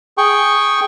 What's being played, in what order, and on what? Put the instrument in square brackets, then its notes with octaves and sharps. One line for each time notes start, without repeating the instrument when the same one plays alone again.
[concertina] G#4 G5 C#6